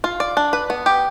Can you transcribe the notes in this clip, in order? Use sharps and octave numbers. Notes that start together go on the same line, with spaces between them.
F4
D5
D4
B4
B3
G4